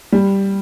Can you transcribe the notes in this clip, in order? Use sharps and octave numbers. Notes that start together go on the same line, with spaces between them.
G3